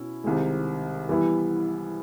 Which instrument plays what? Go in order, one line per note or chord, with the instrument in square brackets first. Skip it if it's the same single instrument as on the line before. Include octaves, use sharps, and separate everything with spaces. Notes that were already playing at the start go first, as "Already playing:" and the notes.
Already playing: [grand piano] B2 C#4 E4
C2 C3 D#3 G#3
E3 G3 B3 E4